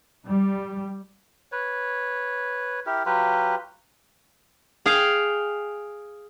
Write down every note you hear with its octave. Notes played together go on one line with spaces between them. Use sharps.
G3
B4 C#5
E4 G4 A#4
F#3 F4 G4 B4
G#4 F5 G5